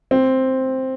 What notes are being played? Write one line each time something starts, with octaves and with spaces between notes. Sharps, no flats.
C4